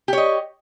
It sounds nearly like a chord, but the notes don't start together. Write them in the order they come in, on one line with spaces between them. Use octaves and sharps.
G4 C#5 D#5